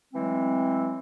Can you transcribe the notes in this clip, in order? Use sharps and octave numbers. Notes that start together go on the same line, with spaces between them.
E3 F#3 G#3 A3 C4